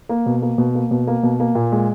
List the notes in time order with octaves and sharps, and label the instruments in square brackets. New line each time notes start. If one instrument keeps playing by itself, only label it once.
[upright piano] A#3
B2
A#3
B2
A#3
B2
A#3
B2
A#3
A#2
G#3